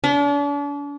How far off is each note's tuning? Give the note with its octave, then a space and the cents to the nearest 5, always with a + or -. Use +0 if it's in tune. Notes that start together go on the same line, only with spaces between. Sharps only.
D4 -40